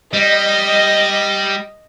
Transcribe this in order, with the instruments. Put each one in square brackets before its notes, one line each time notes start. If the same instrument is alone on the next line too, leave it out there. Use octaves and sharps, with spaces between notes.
[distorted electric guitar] G3 [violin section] D#5